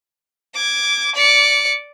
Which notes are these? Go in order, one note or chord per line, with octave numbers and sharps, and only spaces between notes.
D6 G#6
D5 C#7